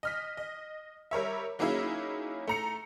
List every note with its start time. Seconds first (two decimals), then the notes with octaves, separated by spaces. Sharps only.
0.03 D#5 F6 B6
0.37 D#5
1.11 G3 A#4 C#5 E5
1.59 F#3 A#3 C#4 D#4 E4 G#4
2.47 A3 A#5 C#7